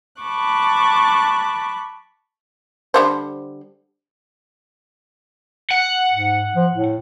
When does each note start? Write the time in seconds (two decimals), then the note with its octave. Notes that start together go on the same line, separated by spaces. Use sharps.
0.21 A5 B5 C#6 D6 F#6
2.94 D3 G3 C5
5.71 F#5
6.10 G#2
6.56 F3
6.73 A2